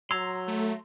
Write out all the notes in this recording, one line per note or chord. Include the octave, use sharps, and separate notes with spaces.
F#3 A#5 C6 E6 G#6
A3